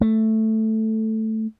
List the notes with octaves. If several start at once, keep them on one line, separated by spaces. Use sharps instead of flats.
A3